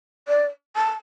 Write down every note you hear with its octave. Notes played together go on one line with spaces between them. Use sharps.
D5
A5